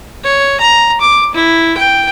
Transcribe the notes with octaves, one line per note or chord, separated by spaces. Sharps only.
C#5
A#5
D6
E4
G5